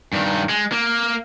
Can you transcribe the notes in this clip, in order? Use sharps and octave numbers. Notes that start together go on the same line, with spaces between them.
G2 D#3
G#3
A#3